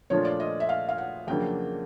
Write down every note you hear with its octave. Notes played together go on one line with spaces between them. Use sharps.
A#2 F3 A3 D4 F4 C#5
D5
D#5
E5
F5
F5
F#5
F2 C#3 F#3 A#3 D4 G5